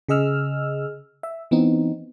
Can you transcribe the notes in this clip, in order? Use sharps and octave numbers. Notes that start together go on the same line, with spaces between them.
C#3 G#4 D#5 E6 F6
E5
E3 B3 C4 D#4